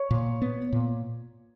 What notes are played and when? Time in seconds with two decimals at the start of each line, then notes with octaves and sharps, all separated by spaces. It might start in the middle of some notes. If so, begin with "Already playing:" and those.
Already playing: C#5
0.11 A#2
0.42 B3
0.73 A#2